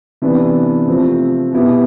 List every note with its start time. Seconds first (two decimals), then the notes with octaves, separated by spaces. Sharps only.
0.22 C3 E3 B3 D4
0.87 C3 F3 A3 C4
1.53 B2 B3 E4 G4